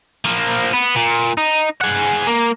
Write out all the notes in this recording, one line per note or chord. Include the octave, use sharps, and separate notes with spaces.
F3 A#3
B3
A#2
D#4
G#4 F#5
A#3